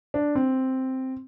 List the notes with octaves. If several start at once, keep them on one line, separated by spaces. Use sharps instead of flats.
D4
C4